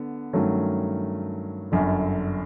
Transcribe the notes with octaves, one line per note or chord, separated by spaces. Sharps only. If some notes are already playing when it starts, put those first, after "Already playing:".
Already playing: D3 B3
G2 D#3 F#3 A3 C#4
G1 F#2 D3